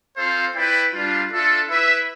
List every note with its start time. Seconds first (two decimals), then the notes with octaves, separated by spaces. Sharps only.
0.17 C4 F4 A4 C5 F5
0.54 E4 B4 D5 G5
0.92 G3 D4 F4
1.30 D4 F4 A4 E5
1.68 E4 B4 E5